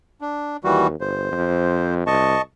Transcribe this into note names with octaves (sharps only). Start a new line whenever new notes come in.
D4
D#2 E3 G3 F#4
G1 C5
F2
C2 D#5 A5 C#6